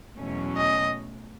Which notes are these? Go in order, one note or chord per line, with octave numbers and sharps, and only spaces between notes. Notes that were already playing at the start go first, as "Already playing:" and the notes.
E2 B2 F#3 A3 C#4
D#5